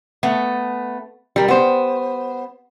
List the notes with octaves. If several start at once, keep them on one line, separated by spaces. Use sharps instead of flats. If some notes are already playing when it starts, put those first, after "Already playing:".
A3 B3
G3 A#4
B3 C5